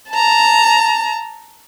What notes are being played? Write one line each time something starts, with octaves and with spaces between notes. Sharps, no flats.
A5 A#5